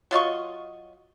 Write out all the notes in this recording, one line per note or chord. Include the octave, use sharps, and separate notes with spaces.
F#3 F4 D#5 C#6